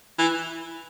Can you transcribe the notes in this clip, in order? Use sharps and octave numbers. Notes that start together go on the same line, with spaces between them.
E3